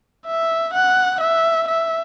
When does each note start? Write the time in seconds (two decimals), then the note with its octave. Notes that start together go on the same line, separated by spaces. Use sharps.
0.26 E5
0.74 F#5
1.21 E5
1.68 E5